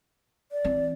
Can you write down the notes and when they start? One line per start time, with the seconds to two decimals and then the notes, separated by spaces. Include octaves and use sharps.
0.52 D5
0.65 E3 C4